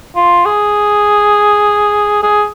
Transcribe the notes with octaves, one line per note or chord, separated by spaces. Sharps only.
F4
G#4
G#4